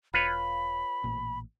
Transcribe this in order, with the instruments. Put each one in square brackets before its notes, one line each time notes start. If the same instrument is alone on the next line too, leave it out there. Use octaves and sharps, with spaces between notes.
[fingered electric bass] E1 [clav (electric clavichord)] F4 B4 C#5 [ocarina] B5
[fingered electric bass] A1 A#2